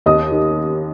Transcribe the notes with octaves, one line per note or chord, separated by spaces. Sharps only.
D#2 D#5 D#6
D#3